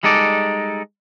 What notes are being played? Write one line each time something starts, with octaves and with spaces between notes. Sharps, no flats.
G3 G#3 D#4 A4 D5